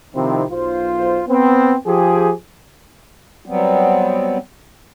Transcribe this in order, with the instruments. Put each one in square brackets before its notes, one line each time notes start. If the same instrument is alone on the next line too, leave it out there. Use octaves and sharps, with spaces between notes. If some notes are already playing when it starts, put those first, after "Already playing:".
[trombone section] C3 D#3 F3 C4 D#4 E4
B1 F4 C5
B3 C4
F3 G4 G#4
[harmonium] F#3 G3 B3 C4